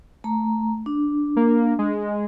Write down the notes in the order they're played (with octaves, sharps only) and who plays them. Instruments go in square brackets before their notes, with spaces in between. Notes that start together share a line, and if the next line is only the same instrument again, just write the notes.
[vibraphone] A3 A#5
D4
[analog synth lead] A#3
G#3